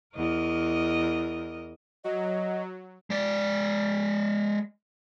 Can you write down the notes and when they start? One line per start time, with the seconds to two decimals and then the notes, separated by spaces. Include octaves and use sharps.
0.16 E2 A#4 D#5
2.04 F#3 D#5
3.10 G#3 D5